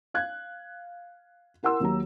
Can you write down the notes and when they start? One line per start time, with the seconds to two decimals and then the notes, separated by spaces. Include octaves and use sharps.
0.14 F5 F#6 G#6
1.63 E4 A#4 F#5 C6 E6
1.80 D#2 F#3 A#5